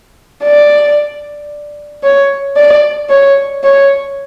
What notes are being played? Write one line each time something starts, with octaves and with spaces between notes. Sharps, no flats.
D5
C#5
D5
C#5
C#5